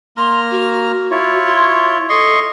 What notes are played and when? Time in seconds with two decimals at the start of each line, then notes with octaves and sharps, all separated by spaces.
0.17 A#3 A#5 C6 F6
0.51 F#4
1.11 E4 F4 C#5
1.46 C6
2.09 A4 D#5 C6 C#6